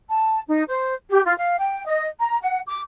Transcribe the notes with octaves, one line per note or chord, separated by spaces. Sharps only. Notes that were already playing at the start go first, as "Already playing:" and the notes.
A5
D#4
C5
G4
F4
F5
G5
D#5
A#5
F#5
D6